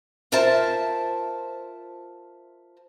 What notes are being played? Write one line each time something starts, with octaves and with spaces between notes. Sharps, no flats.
F4 A#4 C5 E5 A5